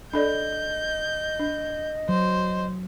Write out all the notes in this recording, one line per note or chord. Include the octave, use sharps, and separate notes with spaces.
D4 A4 D5 D#5 G6
D4
F#3 C5